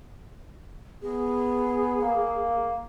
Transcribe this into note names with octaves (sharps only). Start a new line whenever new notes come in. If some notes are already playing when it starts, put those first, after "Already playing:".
B3 G#4
A#3